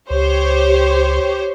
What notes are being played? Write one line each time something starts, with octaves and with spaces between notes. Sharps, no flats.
C#2 G4 C5 C#5